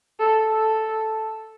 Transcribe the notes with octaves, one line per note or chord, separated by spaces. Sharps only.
A4
A4